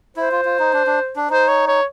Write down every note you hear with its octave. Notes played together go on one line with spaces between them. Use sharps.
E4 C5
F4
F4
D#4
D4
D4
D4
D#4 C5
C#5
C#5